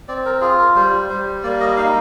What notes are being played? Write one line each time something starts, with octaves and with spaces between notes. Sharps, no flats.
C4 D5
A#4
F4 G#4
A#4
G3 C5
G3 C5
A#3 D5
D#5
D#4 F5